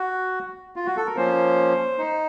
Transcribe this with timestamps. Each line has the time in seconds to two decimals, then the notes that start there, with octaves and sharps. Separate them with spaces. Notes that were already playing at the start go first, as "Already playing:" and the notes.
Already playing: F#4
0.76 F4
0.86 F#4
0.97 A4
1.06 A#4
1.16 F3 A#3 C#4 C5
1.98 D#4